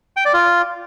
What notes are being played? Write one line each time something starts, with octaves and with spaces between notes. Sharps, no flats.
G5
D5
F4